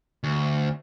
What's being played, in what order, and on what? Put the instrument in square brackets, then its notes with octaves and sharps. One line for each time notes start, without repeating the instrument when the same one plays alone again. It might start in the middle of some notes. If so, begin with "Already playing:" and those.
[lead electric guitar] D2